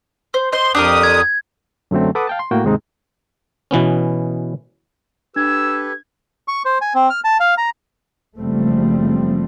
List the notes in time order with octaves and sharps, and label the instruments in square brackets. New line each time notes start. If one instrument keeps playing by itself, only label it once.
[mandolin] C5
[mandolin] C5 D#5 [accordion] C6
[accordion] F2 D#6 [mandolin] D4 G4 A#4
[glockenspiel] G#6
[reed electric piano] F#2 D3 F#3 A3 C4
A4 B4 F#5 D6 D#6
F5 G5 A5
C6
A2 A#3 F#4 G5
D#2 G#2 C3 G#3 C4 D#4
[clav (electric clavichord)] B2 E3 B3 C#4
[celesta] D4 [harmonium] G4 A4 B4 [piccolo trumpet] E6 [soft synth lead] G#6
[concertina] C#6
C5
G#5
C4
F6
A5
F5
A#5
[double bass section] F#1 F3 G3 A3 C4